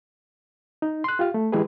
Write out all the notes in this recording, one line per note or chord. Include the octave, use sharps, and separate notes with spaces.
D#4
C6 F#6
F4 G4 F5
A3
E3 G#3 E4 G4 G#4 B4